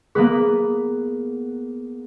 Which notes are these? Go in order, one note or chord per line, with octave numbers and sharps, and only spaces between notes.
A#3 B3 G#4 B4